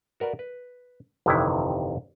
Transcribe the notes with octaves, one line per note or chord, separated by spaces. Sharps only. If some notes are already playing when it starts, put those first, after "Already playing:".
F#4 A#4 B4 D5
B4
G1 F2 C3 D#3 E3 E4